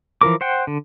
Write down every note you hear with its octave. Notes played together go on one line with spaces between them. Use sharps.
E3 F3 A#4 D6
C5 F#5 G5
D3